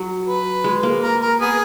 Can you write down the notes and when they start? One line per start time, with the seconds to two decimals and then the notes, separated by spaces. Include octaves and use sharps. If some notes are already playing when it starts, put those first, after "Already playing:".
Already playing: F#3
0.27 B4
0.64 G#3
0.83 A#3
1.02 A#4
1.21 A#4
1.40 B3 G#4